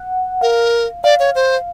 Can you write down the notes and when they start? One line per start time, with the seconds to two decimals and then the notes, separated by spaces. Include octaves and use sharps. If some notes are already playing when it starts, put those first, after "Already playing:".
Already playing: F#5
0.41 A#4 F5
1.04 D5 F5
1.19 C#5
1.35 C5